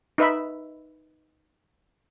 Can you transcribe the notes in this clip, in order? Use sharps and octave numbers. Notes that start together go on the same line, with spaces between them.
D#4 B4 E5 B5